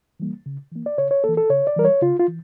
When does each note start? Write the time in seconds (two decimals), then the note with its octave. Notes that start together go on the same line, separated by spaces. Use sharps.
0.20 E3 G3 A#3
0.46 C#3
0.72 E3 A#3
0.86 D5
0.98 C#3 C#5
1.11 C#5
1.24 E3 A#3 A4
1.37 A4
1.50 C#3 C#5
1.67 D5
1.76 E3 G3 A#4
1.85 C#5
2.02 C#3 F4
2.20 F4
2.28 E3